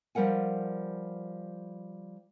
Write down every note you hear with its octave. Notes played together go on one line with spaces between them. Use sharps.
F3 G3 A#4 F#5 G#5